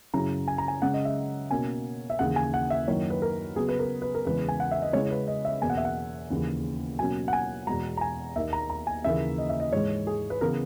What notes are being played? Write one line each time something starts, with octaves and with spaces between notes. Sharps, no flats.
F#2 C#3 F#3 C#4 E4 A#5
G#5
A#5
G#5
C#3 G#3 C#4 F#5
D#5
E5
B2 A#3 C#4 G#5
E5
D#2 C#3 E3 F#5
G#5
F#5
E5
F#2 D#3 A#3 E4 C#5
B4
A#4
C#3 F#3 B3 G#4
B4
A#4
B4
A#4
E2 C#3 E3 G#3 B4
G#5
F#5
E5
D#5
C#3 G#3 C#4 E4 C#5
B4
D#5
E5
E2 B2 A#3 G#5
F#5
E5
F#5
D#2 C#3 E3
B2 F#3 A#3 C#4 G#5
F#5
G#5
E2 B2 G#3 A#5
A#5
G#5
D#2 D#3 A#3 D#4 E5
A#5
A#5
G#5
D#2 C#3 E3 A#3 E5
D#5
E5
D#5
G#2 E3 G#3 C#5
G#4
B4
C#3 E3 B3 A#4